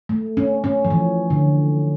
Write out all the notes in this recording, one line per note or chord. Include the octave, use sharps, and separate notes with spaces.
A3
C#4
C#4
F3
E3
D3